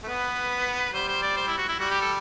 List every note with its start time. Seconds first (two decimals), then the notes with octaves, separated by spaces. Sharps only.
0.03 A3
0.08 B3 B4
0.93 G3 C5
1.08 C5
1.22 D5
1.37 C5
1.48 E4
1.58 F#4
1.69 E4
1.79 G3 F#4
1.91 G4
2.01 A4